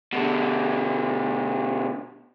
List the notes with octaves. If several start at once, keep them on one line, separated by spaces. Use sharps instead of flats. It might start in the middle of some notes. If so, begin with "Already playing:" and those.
B2 D3